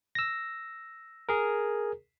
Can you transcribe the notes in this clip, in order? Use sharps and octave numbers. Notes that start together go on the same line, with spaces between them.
E6 A#6
G#4 A#4